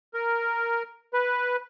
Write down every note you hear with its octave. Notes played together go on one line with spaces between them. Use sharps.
A#4
B4